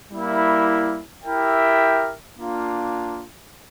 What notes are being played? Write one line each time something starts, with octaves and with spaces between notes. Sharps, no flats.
G3 A#3 E4
E4 G4 A#4 E5 G5
A#3 D4 F4